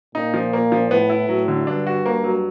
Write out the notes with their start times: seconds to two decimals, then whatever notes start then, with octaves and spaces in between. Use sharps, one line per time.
0.15 A#2 D#4
0.34 F3
0.53 A#3
0.72 F3
0.91 A2 B3
1.10 E4
1.29 A2 F#3
1.48 D3
1.67 G2 D4
1.87 F#4
2.06 A#3
2.24 F#3